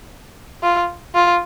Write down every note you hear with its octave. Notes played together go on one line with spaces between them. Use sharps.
F4
F4